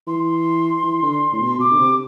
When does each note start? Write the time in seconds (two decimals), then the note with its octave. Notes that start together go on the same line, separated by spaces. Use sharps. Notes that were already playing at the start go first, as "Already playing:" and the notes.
0.07 E3 C6
0.83 E3
1.03 D3
1.32 A2
1.41 B2
1.59 B2 D6
1.72 D3
1.79 C3